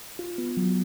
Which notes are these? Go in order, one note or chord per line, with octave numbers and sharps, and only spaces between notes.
F4
B3
F#3